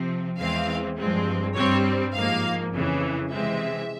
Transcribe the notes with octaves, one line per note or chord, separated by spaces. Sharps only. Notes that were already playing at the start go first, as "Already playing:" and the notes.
Already playing: C3 F3 C4
E2 E3 G#3 C4 F5
G2 F3 G#3 C4
G2 G3 C4 C#5
G#2 F3 A#3 F5
F2 C#3 E3
C3 E3 G#3 C4 E5